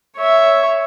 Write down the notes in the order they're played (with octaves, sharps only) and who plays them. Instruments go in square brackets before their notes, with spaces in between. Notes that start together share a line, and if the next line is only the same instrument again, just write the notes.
[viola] C#5 E5